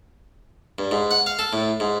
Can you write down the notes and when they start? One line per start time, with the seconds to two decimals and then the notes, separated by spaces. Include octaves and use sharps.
0.79 G2
0.91 G#2
1.11 F#5
1.26 F5
1.39 A4
1.53 A2
1.80 G#2